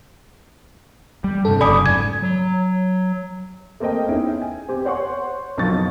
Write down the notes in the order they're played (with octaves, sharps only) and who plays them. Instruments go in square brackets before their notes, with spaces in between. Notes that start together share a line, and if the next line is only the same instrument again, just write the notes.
[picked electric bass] G3
[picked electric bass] G2 C3 [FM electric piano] A4
[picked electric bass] F1 F#2 C#3 [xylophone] D5 G#5 D#6 [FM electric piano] B5 D6
[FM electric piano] G#2 [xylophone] G#6
[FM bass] F#3
[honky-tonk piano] A3 A#3 C4 A#4 D#5 G5
B3 C#4 D#4 E4 G#4 G5
G#5
C4 G4
C5 C#5 F#5 C6 C#6
F#1 B1 F2 F#3 C#6 A6